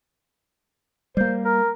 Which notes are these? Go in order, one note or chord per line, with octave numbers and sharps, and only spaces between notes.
G3 A#3 C5
A#4